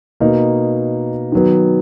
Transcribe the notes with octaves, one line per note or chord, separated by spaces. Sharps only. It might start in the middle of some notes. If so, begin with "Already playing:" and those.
B2 A#3 D#4
D#3 F#3 B3